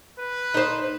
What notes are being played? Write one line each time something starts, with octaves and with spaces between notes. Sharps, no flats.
B4
D#4 C5